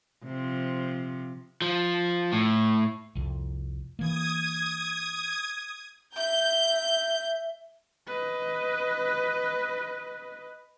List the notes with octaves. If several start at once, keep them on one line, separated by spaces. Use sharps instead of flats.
C3 F3
F3
A2
C2 F2
E3 A#3 D#6 G#6
E5 G6
B4 D#5